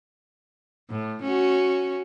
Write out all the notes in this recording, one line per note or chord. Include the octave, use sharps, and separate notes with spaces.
A2
C#4 F#4